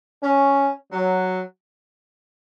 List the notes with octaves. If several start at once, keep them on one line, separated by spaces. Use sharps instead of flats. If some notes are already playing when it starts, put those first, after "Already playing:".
C#4
F#3